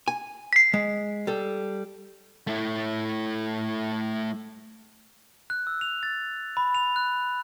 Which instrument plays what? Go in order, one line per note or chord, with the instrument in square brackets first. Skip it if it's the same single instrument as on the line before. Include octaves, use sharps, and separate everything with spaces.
[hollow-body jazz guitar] G#5
[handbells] B6 C7
[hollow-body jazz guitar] G#3
G3 A4
[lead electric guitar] A3 E4
[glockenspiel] F#6
E6
F7
A6
B5
F7
F#6